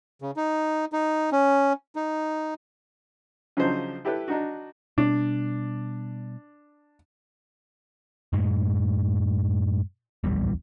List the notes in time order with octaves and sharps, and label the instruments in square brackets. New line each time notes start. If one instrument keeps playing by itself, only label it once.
[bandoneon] C#3
D#4
D#4
C#4
D#4
[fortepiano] C#3 F3 F#3 D4 D#4 C5
E4 G4 A4 B4
D4 D#4 F#4
[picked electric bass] B2 G3 [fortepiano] D4
[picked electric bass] F#2 A2 G#3
D1 A#1 E2 G3